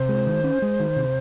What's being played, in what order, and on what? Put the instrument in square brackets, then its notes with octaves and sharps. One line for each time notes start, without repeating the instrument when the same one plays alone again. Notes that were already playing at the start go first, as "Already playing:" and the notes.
Already playing: [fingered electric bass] C3 [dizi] C5
[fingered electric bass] G#3
D#3
C#4
G#3
D#3
C3